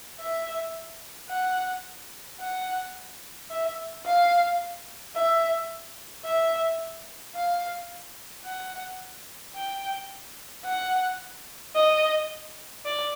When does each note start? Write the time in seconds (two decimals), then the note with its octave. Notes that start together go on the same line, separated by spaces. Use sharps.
0.20 E5
1.30 F#5
2.40 F#5
3.50 E5
4.06 F5
5.15 E5
6.25 E5
7.35 F5
8.45 F#5
9.55 G5
10.65 F#5
11.75 D#5
12.85 D5